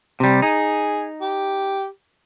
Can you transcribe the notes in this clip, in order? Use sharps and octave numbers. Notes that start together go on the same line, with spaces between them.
C3 G3
D#4 G#4
G4